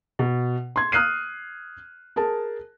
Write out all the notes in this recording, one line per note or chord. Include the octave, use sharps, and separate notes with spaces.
B2
C6 G#6
D#6 F6 F#6 C7 D#7
G#4 A#4 A5